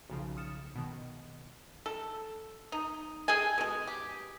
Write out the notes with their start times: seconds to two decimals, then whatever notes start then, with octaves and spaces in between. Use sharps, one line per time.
0.10 B1 C#3 F3
0.37 D#6 F6 A6 C#7 E7
0.75 B2 D#3
1.86 A4
2.72 D#4
3.28 G#4 A4 G5 G#5
3.58 B2 G#3
3.87 G4